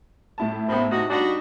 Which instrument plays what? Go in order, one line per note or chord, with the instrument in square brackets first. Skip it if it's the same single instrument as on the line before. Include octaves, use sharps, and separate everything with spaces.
[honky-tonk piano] A2 E4 A5
[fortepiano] A1 B3 [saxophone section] G#2 E3 C4
[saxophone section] C3 F#4 [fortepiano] D#4
[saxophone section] G3 F#4 [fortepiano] D4 D#4